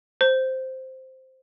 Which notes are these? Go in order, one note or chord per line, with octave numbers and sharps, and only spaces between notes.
C5